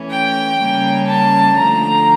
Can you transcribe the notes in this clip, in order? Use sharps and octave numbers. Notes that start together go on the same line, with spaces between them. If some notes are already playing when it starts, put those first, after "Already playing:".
Already playing: E3 A3 C#4
G5
C#3 G3 A#3 C#4
A5
D3 F3 A3 A#5